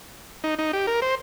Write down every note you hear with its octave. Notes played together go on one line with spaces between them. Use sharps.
D#4
D#4
G4
A#4
C5